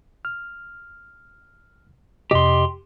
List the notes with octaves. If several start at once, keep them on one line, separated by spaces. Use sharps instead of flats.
F6
F2 C3 G4 D#5 C6